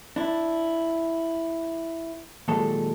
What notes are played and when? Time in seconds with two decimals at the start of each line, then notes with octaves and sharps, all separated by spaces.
0.16 D4 E4
2.48 D#2 A#2 F#3 G#3 A4 A5